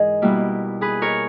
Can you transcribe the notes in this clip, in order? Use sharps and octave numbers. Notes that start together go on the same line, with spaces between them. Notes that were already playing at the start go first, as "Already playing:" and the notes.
Already playing: G#2 E3 G#4 A#4 D#5
B2 G3 A#3 E4
G#4 B4
A#4 C#5